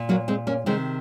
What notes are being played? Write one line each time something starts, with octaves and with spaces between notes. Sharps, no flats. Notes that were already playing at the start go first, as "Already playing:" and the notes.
Already playing: A#2
F#3 A#3
G#3 C4
A#3 C#4
C3 D#3 G#3 C4